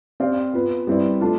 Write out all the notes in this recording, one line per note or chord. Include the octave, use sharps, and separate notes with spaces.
C4 G4 D5 F5
B3 F4 B4
G3 C4 E4 B4 D5
A3 D4 F4